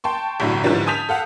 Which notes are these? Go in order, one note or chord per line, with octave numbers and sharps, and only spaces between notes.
G5 A5 C6 C#6
G1 C2 A2 D3 F#3
G#2 D3 E3 F3 G3 C#4
G#5 A5 D#6 G6 B6 F7
A4 F5 F#5